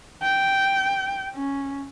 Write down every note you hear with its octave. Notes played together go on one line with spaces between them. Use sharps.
G5
C#4